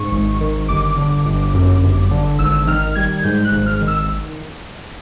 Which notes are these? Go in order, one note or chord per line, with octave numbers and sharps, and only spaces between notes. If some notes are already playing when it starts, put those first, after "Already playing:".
Already playing: G#2 C#6
G#1
D#3
G1 D6
D3
G1
F#2
G1
D3
G#1 E6
D#3 F6
G3 G#6
G#2 G6
F#6
G#1
F6
D#3
E6